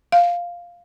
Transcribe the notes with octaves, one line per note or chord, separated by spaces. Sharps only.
F5